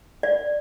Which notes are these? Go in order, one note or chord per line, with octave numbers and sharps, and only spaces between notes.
D5